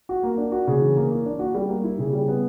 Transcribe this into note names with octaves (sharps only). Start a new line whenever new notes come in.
F#4
A#3
D4
F#4
C#3
E3
A#3
A#3
D4
F#4
G3
A#3
E4
C#3
G3
B3